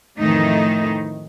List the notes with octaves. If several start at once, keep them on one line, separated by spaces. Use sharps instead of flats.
F2 A2 D#3 E3 A3 D#4